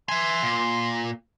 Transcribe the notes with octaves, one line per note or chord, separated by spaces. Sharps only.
E5 G#5 C6
A#2